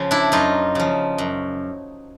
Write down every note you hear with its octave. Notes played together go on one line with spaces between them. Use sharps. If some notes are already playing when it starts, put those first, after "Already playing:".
Already playing: C#3 F3
D4 E4
F#2 D#4 F4
C#3 F3
F#2